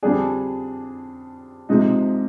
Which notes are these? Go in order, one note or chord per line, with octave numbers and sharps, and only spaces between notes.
F2 D3 G3 D4 G#4
C3 F3 G#3 D#4